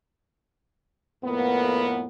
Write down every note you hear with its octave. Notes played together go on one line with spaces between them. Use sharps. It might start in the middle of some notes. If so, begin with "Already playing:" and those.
F2 A2 A#3 B3